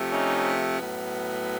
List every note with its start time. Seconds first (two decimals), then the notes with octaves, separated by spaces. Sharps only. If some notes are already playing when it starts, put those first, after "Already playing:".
Already playing: C3 F3 A3
0.11 C#4 D#4
0.80 A2 F#3 B3